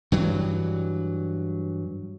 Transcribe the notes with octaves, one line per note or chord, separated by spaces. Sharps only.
G2 E3 F#3